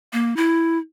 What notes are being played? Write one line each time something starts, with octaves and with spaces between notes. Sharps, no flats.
A#3
E4